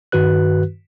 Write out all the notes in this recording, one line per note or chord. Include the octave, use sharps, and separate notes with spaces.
G2 D#3 F#4 B4 F#6